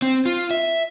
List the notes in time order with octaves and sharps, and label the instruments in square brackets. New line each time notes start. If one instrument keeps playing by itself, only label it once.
[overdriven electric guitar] C4
F4
E5